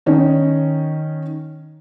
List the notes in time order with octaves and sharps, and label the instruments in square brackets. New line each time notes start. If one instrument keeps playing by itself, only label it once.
[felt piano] D#3 C#4 D#4